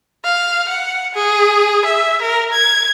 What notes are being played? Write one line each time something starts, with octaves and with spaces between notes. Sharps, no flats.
F5
F#5
G#4
E5
A#4
G#6